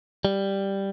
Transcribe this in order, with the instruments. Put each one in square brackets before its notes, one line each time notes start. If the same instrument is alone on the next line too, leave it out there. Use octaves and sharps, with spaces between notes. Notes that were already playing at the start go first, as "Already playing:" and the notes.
[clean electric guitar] G3